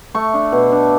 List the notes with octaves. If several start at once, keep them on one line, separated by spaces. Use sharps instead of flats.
A3 C#6
D4
B2
D4